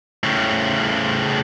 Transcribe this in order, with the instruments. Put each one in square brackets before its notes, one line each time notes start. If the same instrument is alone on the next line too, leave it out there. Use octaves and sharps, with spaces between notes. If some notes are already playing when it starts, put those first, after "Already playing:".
[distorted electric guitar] A2 C#3